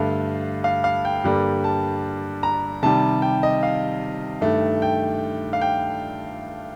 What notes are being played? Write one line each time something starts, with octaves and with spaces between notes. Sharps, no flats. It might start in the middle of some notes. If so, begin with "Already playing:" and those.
Already playing: G2 D3 A3 F5
F5
F5
G5
G2 D3 G3 A#3
A5
A#5
C3 D#3 G3 A5
G5
D#5
F5
G2 D#3 A3
G5
F5
G5